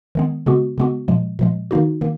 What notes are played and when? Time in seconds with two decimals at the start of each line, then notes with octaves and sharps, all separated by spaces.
0.15 D#3 G#3 B3
0.46 C#3 G#3 B3 F#4
0.78 C#3 G#3 B3 F#4
1.08 A#2 F3 G#3
1.39 A#2 F3 G#3
1.71 D#3 A#3 D#4 F#4
2.01 D#3 A#3